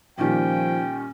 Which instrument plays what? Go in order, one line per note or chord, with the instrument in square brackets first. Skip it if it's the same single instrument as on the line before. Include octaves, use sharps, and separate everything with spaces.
[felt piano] A#2 D#3 G3 [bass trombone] F3 [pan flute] C#4 [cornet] G5